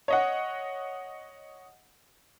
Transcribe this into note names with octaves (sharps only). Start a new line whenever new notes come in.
C#5 D#5 F#5